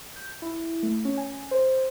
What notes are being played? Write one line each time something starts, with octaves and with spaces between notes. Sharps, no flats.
G6
E4
A3
C#4
G#5
C5